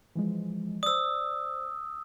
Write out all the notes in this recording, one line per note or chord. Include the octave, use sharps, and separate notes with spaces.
E3 F3 G#3
C5 D5 D#6 E6